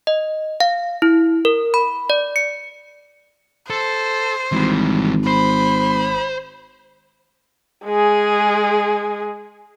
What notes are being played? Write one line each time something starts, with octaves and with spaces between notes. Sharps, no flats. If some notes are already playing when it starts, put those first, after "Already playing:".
D#5
F5
E4
A#4
B5
D5
C#7
A4 C5
G#1 E3 G3
C5 B5
G#3 G#4